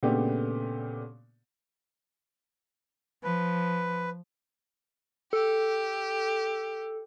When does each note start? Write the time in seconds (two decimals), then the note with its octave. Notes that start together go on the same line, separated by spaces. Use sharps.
0.03 A#2 C#3 A3 B3 D4 G4
3.24 F3 B4
5.33 G4 A4